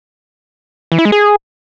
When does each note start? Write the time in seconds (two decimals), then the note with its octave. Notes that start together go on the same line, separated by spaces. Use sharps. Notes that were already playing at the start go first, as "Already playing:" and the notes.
0.92 E3
0.98 E4
1.05 G#3
1.12 G#4